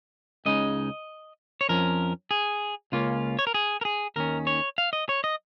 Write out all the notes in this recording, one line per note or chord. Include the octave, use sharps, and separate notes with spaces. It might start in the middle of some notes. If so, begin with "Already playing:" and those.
C#2 C#3 G#3 D#4 D#5
C#5
F2 F3 C#4 A#4
G#4
C#2 C#3 A#3 C#4 F4
C#5
A#4
G#4
A#4
G#4
D#2 D#3 C#4 A#4
C#5
F5
D#5
C#5
D#5